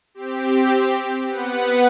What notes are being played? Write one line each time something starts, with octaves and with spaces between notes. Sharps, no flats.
C4 G4
B3 B4 F#5